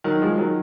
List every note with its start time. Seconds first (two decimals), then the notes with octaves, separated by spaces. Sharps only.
0.04 D#3 F#3
0.22 F3 G#3
0.38 D#3 F#3